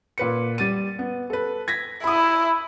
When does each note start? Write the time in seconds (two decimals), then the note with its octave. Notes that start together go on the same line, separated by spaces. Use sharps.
0.18 A#2 B4 C#7
0.58 G3 A6 D#7
0.99 B3
1.30 A4 B4
1.68 G#6 A#6 B6
2.04 E4 B5 D#6